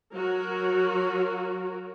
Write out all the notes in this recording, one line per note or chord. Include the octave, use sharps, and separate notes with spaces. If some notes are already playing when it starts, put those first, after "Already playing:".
F#3 F#4 A#4